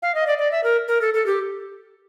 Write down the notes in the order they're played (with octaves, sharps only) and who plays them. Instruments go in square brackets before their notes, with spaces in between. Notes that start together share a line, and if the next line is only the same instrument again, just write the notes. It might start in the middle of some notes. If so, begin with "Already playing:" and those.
[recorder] F5
D#5
D5
D5
E5
A#4
A#4
A4
A4
G4